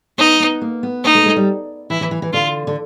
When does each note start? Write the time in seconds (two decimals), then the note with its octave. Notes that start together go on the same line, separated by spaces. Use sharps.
0.18 B3 D#4
0.40 B3
0.62 A#3
0.83 B3
1.04 A#3 D#4
1.15 A3
1.26 G#3
1.36 G3
1.90 E3 E4
2.01 E3
2.11 E3
2.22 E3
2.33 D3 F4
2.67 D3